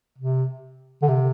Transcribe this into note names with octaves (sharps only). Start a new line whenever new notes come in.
C3
D3
C3